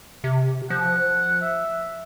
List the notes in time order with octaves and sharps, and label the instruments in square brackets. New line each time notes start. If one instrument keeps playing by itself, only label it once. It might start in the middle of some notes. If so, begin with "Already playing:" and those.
[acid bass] C3
[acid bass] F3 [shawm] F#5
[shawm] E5